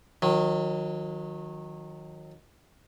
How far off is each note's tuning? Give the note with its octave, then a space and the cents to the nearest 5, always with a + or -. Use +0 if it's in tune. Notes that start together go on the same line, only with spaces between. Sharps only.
D#3 +5 F#3 -30